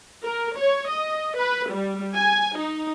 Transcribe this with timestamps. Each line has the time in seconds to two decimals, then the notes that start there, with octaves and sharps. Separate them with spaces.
0.24 A#4
0.57 C#5
0.91 D#5
1.37 B4
1.71 G3
2.16 G#5
2.57 D#4